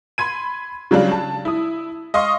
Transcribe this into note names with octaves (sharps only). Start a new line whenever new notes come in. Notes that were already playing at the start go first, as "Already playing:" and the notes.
B5 C6 G#6 D#7
C#3 F#3 G3 D4 F4
A5
E4 D#6
D#5 F5 C6 C#6 D#6